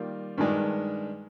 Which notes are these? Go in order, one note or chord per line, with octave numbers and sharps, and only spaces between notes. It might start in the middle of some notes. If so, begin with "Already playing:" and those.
Already playing: D#3 G3 A#3 F4
G2 D#3 G#3 D4